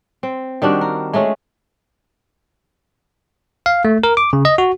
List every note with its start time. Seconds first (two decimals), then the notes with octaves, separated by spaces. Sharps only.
0.23 C4
0.62 D#3 G3 D4 F#4
0.81 A#4
1.13 G#3 A3 C#4 G#4
3.66 F5
3.85 A3
4.03 A#4
4.17 D6
4.33 C#3
4.45 D#5
4.58 F#4